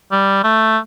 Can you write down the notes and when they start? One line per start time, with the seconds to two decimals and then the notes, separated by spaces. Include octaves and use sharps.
0.12 G3
0.44 A3